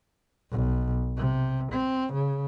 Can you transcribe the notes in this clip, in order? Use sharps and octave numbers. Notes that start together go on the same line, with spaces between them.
B1
C3
C4
C#3